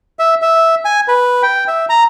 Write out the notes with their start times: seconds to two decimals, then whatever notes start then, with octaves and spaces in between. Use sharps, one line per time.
0.19 E5
0.42 E5
0.85 G#5
1.08 B4
1.43 G5
1.68 E5
1.89 A#5